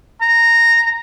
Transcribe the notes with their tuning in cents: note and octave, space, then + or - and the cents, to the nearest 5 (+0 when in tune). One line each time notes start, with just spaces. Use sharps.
A#5 -10